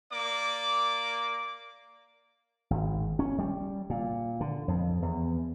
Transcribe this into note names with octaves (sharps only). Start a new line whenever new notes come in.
A#3 D5 D6
G#1
C#4
G3
A#2
D3
F2
E2